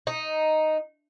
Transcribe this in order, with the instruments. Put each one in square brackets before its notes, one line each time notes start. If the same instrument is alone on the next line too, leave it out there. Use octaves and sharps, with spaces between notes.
[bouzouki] D#4